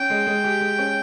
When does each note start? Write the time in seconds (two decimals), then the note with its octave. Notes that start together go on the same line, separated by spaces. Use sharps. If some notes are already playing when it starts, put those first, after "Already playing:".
Already playing: C#4 G5
0.10 G#3
0.27 G#3
0.44 G4
0.61 G#3
0.79 C#4